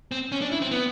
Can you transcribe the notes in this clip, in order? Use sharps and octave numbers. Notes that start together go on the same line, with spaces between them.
C4
C#4
D4
E4
C4
B3